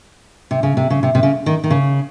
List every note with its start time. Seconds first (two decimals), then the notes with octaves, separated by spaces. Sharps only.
0.51 C3
0.63 C#3
0.77 C3
0.90 C#3
1.03 C3
1.15 C3
1.23 C#3
1.46 D#3
1.64 D#3
1.70 C#3